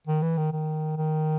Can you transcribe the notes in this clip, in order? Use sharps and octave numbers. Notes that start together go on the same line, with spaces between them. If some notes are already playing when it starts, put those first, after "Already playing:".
D#3
E3
D#3
D#3
D#3